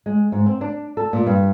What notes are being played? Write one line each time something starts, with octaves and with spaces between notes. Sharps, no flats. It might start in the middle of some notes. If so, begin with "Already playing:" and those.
G#3
G#2
C4
D4
A4
A#2
G2